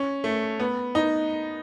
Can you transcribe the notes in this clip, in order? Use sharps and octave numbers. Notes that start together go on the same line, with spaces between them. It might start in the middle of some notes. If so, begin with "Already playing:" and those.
Already playing: C#4
A3
B3
D#4